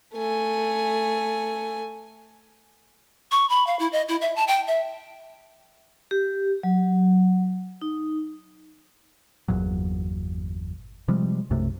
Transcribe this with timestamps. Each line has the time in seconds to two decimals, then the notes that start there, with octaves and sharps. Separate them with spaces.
0.14 A3 G#5
3.31 C#6
3.49 B5
3.67 F5
3.79 E4
3.93 D#5
4.09 E4
4.21 E5
4.36 A5
4.48 G5
4.67 E5
6.11 G4
6.63 F#3
7.82 D#4
9.48 G1 E2 A#2 F#3
11.08 C3 F3 G3 G#3
11.50 B1 F#2 C3 A3